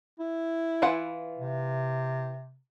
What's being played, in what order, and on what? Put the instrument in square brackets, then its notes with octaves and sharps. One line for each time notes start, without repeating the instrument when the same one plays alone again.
[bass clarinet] E4
[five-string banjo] E3 F4 F#5
[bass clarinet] C3